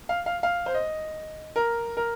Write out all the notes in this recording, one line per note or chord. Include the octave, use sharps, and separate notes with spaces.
F5
F5
F5
C5
D#5
A#4
A#4